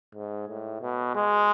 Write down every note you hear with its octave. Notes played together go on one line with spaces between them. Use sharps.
G#2
A2
B2
G#3